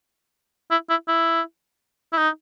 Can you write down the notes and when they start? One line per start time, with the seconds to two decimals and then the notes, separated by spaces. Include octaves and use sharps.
0.71 E4
0.90 E4
1.08 E4
2.13 E4
2.18 D#4